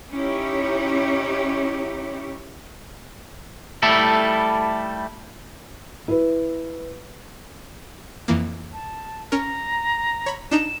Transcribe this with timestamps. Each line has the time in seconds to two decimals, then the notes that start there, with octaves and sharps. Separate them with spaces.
0.11 C#4 D#4 E4 G4 C#5
3.83 G3 A3 E4 A4
6.08 E4 B4
8.28 F2 E3 A#3
8.73 A5
9.32 C#4 A#4 A#5
10.26 C#5 B5
10.51 D4 D#4 A#5 E7